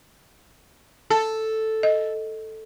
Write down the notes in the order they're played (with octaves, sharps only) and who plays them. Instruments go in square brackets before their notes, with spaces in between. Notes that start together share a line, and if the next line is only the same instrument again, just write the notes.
[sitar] A4 [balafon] A5
[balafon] D#5